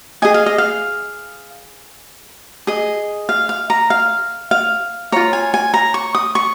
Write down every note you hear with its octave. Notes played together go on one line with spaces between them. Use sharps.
G#4 D#5 G#5
F5
D#5
F5
G#4 D#5
F5
F5
A#5
F5
F5
F4 C#5 A#5
G#5
G#5
A#5
C#6
D#6
C#6